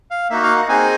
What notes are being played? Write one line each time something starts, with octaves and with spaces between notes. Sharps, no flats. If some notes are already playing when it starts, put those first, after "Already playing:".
F5
A#3 D#4 F#4 E5
F5
F#5
C4 D#4 G#4 G#5